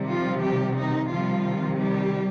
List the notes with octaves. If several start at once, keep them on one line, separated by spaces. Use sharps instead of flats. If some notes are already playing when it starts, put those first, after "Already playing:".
Already playing: C3 D#3 G3
F3 F4
G3 G4
D#3 D#4
C3 D#3 F3 G3 F4
G3 G4